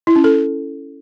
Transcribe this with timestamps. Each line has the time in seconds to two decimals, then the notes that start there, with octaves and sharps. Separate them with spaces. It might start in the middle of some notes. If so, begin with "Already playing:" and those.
0.07 E4
0.16 C#4
0.24 A4